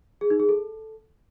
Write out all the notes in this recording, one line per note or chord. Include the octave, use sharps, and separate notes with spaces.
G#4
D#4
G#4
A4